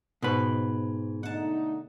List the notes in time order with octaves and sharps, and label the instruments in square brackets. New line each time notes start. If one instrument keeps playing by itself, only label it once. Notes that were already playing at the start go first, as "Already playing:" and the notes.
[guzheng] G#2 [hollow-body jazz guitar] B2 B4
[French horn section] D3 A3 D#4 [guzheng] F#5 A5